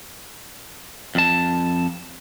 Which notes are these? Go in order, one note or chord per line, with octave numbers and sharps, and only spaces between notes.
F2 A5